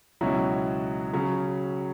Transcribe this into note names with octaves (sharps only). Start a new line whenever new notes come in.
C#2 B2 F#3 C#4 E4
C#3 F#3 C#4